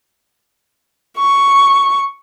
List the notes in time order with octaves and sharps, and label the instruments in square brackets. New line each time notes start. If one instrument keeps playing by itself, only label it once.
[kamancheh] C#6